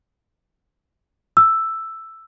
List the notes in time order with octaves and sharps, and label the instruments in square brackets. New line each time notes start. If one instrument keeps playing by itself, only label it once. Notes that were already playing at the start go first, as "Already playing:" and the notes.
[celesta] E6